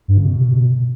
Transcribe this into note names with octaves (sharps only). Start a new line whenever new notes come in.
G2
C#3
B2